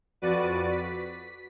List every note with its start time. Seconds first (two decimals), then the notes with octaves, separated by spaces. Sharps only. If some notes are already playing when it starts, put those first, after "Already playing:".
0.22 F2 F#4 B4 D5 A6 D#7
0.71 B6